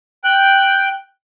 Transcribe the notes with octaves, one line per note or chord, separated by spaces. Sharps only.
G5 F#6